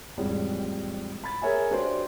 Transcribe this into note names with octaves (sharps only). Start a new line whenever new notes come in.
A1 F2 G3 G#3
B5 A6
G#4 A#4 C#5 E5 G#5
D4 F#4 G4 B4 C5 D5